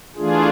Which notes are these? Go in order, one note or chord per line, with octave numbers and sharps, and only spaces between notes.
E3 A3 D4 F4 G#4